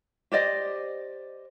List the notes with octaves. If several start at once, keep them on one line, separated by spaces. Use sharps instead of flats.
G4 C5 D5 D#5